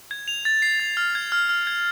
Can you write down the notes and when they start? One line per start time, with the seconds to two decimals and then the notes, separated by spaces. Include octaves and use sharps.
0.11 G#6
0.28 F7
0.45 A6
0.62 C7
0.80 A6
0.97 F6
1.15 G#6
1.32 F6
1.49 F6
1.67 G#6